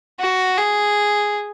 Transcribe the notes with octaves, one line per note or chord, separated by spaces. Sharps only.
F#4
G#4